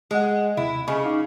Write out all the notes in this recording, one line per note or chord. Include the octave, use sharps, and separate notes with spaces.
G#3 D#5 F#5
D#2 C3 E4
C#3 G#4 D#5 C#6
D#4 F5 D6